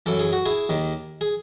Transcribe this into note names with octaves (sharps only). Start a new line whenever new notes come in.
F#2 E3 A4
G#4
F#4
E4 G#4
D#2 D#3
G#4